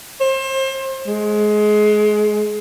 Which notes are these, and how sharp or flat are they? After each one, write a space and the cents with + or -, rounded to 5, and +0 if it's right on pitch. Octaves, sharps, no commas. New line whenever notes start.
C5 +35
G#3 +25